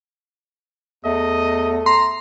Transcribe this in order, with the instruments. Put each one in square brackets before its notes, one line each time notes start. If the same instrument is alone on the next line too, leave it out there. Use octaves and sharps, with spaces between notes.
[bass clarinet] E2 [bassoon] A3 [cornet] D#5
[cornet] A#5 [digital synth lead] C6